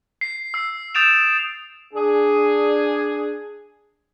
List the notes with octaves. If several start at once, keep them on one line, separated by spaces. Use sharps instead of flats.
C7
E6 C7
D#6 G6 A6 D7 E7 F7
D4 G#4